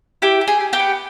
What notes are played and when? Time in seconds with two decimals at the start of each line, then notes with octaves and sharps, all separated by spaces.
0.22 E4 G4 G5
0.41 G4
0.48 G#4 G#5
0.60 G4
0.73 G4 G5
0.79 B3